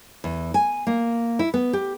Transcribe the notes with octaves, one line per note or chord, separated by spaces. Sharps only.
E2
G#5
A#3
E4
B3
G4